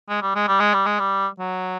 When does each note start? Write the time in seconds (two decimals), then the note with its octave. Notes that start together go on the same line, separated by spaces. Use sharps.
0.09 G#3
0.22 G3
0.35 G#3
0.48 G3
0.60 G#3
0.74 G3
0.86 G#3
1.00 G3
1.39 F#3